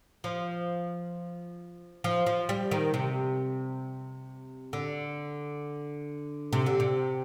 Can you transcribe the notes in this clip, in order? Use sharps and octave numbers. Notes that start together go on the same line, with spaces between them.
F3
F3
F3
G3
D#3
C3
D3
C3
D3
C3